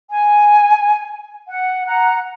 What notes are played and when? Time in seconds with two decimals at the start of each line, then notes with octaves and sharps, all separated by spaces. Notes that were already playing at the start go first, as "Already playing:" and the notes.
0.10 G#5
1.47 F#5
1.85 F#5 A#5